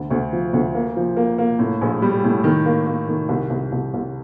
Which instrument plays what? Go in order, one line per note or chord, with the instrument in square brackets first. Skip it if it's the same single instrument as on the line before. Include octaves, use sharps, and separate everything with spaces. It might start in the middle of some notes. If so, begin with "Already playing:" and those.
Already playing: [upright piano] D2 D3
D2
F3
D2
A#3
F3
A#3
A#3
A2
A#1
G3
A2
D#3
A#3
A#3
D#3
C2
C2
C2
C2